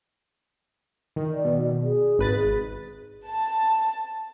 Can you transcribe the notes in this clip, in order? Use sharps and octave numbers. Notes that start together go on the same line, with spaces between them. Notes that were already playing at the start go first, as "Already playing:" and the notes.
D#3
D5
B2
G#4
G#1 B4 A6
A5